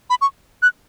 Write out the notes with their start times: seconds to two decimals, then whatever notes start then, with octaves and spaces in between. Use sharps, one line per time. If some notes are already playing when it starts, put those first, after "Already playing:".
0.10 B5
0.21 C#6
0.62 F#6